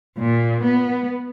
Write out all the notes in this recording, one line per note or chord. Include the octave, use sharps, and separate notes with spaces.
A#2
B3